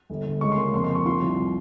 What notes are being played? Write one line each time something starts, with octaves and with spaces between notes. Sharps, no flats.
G1
G1
C#2 C#6
C6
A#3
F2 C6
C6
F2
C#6
F3 C6
C2